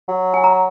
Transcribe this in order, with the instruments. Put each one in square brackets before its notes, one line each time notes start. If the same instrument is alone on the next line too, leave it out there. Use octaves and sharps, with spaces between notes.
[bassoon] F#3
[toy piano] G#5
A#5